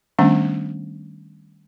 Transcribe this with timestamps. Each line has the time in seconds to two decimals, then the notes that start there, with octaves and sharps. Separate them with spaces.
0.19 D#3 G3 A3 B3 C#4 D4